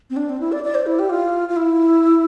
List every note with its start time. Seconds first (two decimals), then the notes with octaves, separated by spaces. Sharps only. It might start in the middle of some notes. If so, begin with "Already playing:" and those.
0.10 C4
0.17 D4
0.29 C4
0.40 E4
0.52 D5
0.64 D5
0.75 C5
0.86 E4
0.99 G4
1.10 F4
1.49 F4
1.56 E4